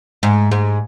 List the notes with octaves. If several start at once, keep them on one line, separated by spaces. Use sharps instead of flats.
G#2
G#2